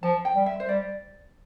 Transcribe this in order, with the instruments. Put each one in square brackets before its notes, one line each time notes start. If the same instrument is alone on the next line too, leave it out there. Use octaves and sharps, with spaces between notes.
[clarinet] F3 [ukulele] A5
[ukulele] G5
[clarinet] G3
[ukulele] E5
C5
[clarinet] G3 [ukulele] D5